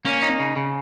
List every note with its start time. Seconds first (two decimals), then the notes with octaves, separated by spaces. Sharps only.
0.05 A#3 C#4
0.22 D#4
0.39 C#3
0.56 C#3